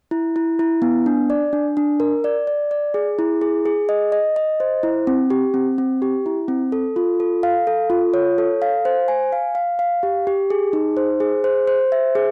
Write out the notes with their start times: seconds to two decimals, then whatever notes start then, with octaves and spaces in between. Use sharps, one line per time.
0.11 E4
0.36 E4
0.59 E4
0.82 B3
1.06 D4
1.30 D5
1.53 D4
1.77 D4
2.00 A#4
2.24 D5
2.47 D5
2.71 D5
2.94 G#4
3.19 E4
3.41 G#4
3.66 G#4
3.89 D#5
4.12 D#5
4.36 D#5
4.60 C5
4.83 E4
5.07 C4
5.30 G4
5.54 C4
5.78 C4
6.02 G4
6.26 E4
6.48 C4
6.72 A4
6.96 F4
7.20 A4
7.43 F5
7.67 A4
7.90 F4
8.14 C#5
8.38 A4
8.62 F5
8.85 C5
9.08 G#5
9.32 F5
9.55 F5
9.79 F5
10.03 G4
10.27 G4
10.50 G#4
10.73 D#4
10.97 C5
11.20 G#4
11.44 C5
11.67 C5
11.92 E5
12.15 G#4